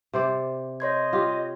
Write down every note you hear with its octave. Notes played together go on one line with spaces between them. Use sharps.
C3 C5 D5
C#5 D#5 C6 G#6
F4 G4